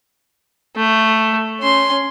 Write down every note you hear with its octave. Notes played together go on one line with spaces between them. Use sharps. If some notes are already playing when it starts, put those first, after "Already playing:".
A3
C#4 C6